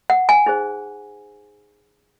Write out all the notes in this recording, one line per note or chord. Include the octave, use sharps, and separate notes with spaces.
F#5
G#5
D#4 G#4 C5